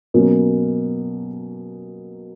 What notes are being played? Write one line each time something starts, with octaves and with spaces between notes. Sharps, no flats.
B2 F#3 A#3 C#4